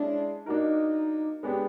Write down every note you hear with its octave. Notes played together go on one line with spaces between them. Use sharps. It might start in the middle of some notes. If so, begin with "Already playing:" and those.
Already playing: G#3 C#4 D4 E4 G#4
A#3 D4 D#4 F#4 A#4
G#3 B3 D4 G4